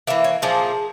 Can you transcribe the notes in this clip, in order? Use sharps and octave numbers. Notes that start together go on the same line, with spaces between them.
E3 A#3 E5
C#5
A#2 F3 A#3 G#4